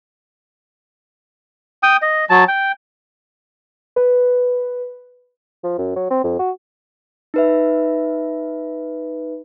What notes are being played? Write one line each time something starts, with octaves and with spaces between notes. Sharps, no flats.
G5 D#6
D#5
F#3 A5
G5
B4
F3
F#2
F#3
C4
F2
F#4
D#4 B4 E5